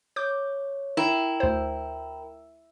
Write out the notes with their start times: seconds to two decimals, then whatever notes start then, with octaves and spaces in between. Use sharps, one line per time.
0.16 C#5 D6 G6
0.97 E4 A#4 G5 A#5
1.40 D2 C5